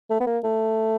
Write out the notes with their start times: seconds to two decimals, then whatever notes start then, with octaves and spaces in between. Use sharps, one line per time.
0.10 A3
0.20 B3
0.27 A#3
0.44 A3